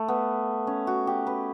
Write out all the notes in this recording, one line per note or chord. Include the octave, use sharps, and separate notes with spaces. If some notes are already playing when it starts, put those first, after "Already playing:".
Already playing: A3
B3
C#4
F#4
G4
B4